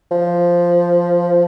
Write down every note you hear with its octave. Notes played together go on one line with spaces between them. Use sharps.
F3